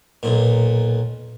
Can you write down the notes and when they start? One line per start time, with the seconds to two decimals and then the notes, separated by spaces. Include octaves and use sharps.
0.23 B1 A#2